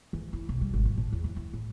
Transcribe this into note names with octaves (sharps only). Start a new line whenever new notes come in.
E3
E4
B1
G3
G#1
F3
A2
E2
E3
E3
A2